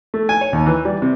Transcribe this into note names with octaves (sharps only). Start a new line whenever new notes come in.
A3
G#5
C#5
D#2
E3
G3
C3